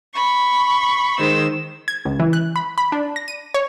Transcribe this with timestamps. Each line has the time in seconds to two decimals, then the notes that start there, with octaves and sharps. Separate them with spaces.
0.15 B5 C#6
1.19 D#3 G#3 C5 E6
1.88 G#6
2.05 C#2
2.20 E3
2.33 F#6
2.56 B5
2.78 B5
2.92 D4
3.16 A#6
3.28 D#7
3.54 C#5